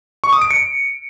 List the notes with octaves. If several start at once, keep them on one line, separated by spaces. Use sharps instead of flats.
C#6
D#6
D7
C#7